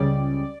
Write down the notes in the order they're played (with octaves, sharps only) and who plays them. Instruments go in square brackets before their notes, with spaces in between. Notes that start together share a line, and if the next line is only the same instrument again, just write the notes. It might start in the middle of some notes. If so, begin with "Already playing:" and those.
Already playing: [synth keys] C#2 C#3 G3 D5